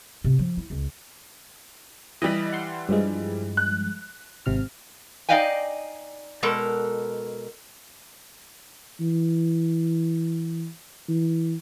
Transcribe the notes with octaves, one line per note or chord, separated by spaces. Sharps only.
C3
F3
E4
C#2
E3 G3 D#5 B5
F#5 C6
G2 F3 G#3
F#6
G#1 C3 F6
D#4 D5 D#5 F5 G5 G#5
B2 G#3 A4 A#4
E3
E3